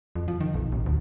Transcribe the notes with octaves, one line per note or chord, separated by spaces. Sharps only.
F2
F3
D#3
B1
A1
D2